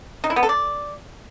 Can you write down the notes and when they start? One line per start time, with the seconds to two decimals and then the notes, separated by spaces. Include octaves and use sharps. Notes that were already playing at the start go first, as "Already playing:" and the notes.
0.24 D#4
0.30 E4
0.36 B3
0.43 A4
0.49 D5